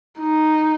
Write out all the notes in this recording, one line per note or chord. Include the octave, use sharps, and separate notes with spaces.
D#4